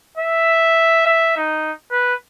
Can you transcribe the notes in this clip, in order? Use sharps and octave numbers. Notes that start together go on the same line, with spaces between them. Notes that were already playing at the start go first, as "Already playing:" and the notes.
E5
E5
D#4
B4